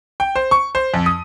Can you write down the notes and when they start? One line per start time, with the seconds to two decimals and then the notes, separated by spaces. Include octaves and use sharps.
0.20 G5
0.36 C5
0.51 C#6
0.75 C5
0.94 F2
1.06 D#6